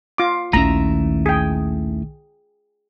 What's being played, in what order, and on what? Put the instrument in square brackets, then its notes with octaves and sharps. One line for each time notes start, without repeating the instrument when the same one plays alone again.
[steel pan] F4 D6
[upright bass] A#1 D#3 [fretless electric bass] D#2 C#4 [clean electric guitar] A3 E4 E5 [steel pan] A#5
[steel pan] G#4 G5